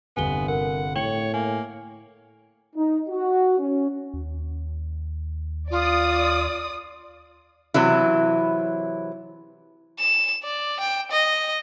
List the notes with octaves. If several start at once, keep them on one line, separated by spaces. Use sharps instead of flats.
G1 G2 C3 B3 G#5 G7
A#4 F#5
A2 C#5 G5 C#7 F#7
A#3 G#5
D#4
F#4
C#4
D#2
F4 D5 D#6
C3 E3 F#3 E4
E7
D5
G5
D#5